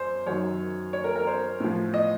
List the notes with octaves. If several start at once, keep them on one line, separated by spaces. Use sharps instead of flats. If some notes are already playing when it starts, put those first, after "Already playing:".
Already playing: F#2 C5
F#2 D#3 F#3 C#5
C#5
A#4
A#4
C5
A2 F3
D#5